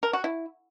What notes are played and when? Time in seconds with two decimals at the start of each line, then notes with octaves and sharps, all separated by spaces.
0.03 A#4
0.13 F#4
0.24 E4